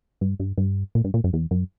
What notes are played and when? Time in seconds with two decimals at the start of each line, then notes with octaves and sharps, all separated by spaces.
0.21 G2
0.40 G2
0.58 G2
0.95 A#2
1.04 G2
1.14 A#2
1.24 F#2
1.33 E2
1.51 F#2